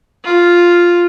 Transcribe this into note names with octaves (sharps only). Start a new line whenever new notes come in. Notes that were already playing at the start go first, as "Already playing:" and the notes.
F4